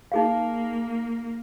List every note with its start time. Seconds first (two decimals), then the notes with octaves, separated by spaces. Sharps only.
0.12 A#3 D#4 G#4 F5